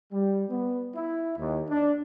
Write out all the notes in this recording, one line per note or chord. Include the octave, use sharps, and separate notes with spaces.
G3
B3
E4
D#2
D4